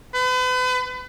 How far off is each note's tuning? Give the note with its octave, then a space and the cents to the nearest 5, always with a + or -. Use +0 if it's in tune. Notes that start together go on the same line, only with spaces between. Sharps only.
B4 +40